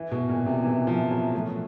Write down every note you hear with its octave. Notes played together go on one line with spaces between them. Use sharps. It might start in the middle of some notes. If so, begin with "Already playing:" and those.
Already playing: E3
B2
A#2
C3
E3
F3
F#3
A3